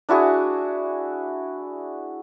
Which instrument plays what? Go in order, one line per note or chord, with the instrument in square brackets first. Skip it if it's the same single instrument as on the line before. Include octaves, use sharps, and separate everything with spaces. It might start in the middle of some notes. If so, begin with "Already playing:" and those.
[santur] D4 E4 F#4 G#4